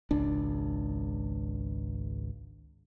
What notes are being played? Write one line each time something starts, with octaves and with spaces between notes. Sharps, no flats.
G#1 C#2 D4